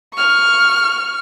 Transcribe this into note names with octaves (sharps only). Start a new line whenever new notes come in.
C#6 F6